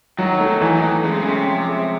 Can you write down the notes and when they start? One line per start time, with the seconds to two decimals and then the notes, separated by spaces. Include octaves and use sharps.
0.18 D#3 F#3
0.33 D#3
0.40 A3
0.47 D#3
0.61 D#3 E3
0.76 D#3
0.83 A3
1.04 C#3 G#3
1.11 C3
1.19 C#3
1.26 C3 C#4
1.47 F3
1.69 G#3